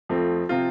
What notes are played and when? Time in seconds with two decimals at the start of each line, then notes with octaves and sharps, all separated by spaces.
0.09 F2 F3 A3 C4
0.49 C3 F3 C4 F4